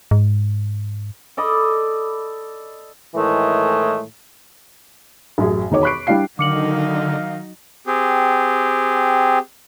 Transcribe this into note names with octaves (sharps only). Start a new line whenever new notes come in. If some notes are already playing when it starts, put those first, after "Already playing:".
G#2
A4 D5 D#5 B5
A2 D#3 E3 G#3 A3
A1 F#2 G#4
E1 D#3 D#4 F#4 C#5 D6
B5 C#6 F#6 C7 D7
G3 D4 E4 F5 C7
D3 D#3 F#3 D#4 F5 D6 C#7 F#7
C4 G4 G#4